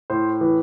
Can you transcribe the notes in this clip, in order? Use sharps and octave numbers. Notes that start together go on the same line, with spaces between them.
A2 C5
E3